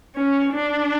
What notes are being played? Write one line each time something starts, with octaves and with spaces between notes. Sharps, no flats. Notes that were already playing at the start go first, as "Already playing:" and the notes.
C#4
D4